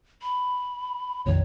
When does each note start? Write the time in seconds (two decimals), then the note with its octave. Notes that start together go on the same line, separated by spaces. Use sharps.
0.22 B5
1.26 A#1 F2 D#3 C#5